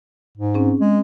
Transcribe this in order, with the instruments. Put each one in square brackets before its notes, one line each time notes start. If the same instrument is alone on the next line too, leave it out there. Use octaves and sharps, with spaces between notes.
[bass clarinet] G#2
[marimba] C4 C#4 G#4
[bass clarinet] G#3